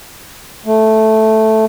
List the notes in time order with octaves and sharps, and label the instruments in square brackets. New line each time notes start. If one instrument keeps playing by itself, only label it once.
[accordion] A3